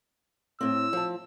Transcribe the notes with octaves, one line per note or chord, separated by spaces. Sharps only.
A2 C4 E6
F3 A5